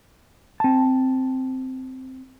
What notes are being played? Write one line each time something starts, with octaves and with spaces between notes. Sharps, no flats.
C4 A5